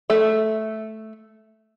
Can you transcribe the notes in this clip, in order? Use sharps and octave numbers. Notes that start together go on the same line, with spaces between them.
A3 A4 E5